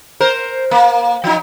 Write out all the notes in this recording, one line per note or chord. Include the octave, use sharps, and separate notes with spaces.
A#4 C5
A#3
F3 D#4